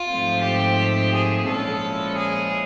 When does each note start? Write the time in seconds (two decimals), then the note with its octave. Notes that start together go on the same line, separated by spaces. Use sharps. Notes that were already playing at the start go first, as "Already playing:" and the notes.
Already playing: F4
0.10 G#2 F3 A3 C4
0.44 G4
1.13 G#4
1.47 A#2 F3 G#3 C#4 E4 A4
2.16 G#4